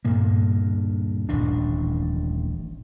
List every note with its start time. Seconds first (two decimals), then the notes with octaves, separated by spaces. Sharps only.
0.05 D2 G2 A#2 A#3
1.29 D#1 A1 D4